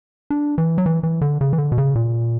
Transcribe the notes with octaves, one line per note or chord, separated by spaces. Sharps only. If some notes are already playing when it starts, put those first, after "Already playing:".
D4
E3
F#3
E3
E3
D3
C#3
E3
D3
B2
C#3
A#2